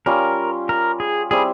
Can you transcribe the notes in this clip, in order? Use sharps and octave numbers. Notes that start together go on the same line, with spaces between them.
G3 C#4 F4 A#4
A#4
G#4
G3 C4 E4 G#4